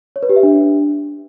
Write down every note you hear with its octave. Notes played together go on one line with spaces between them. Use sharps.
C#5
B4
G4
E5
D4